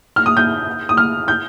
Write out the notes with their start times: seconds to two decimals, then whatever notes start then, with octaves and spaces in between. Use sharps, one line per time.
0.16 F6
0.26 D#6
0.37 G6
0.89 D#6
0.97 F6
1.28 G6